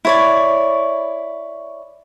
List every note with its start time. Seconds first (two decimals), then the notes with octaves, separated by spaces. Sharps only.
0.05 E4 C#5 D5